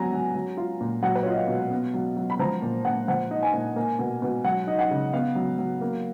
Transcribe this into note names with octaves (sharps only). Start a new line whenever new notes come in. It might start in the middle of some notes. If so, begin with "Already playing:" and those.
Already playing: F#3 B3 G#5 A#5
F#3
F#3
F4
A#2
F#3 F#5
B4
C#5
F4 D#5
F5
B2
B3
F#3
F#3
B5
F3 A#5
A#2
A#2 F#5
F3 F#5
D#4
G#5
A#2
A#3
B2
B2
F#3 F#5
D#4
F#5
C#3
B3 F5
F#3
F#3
A#3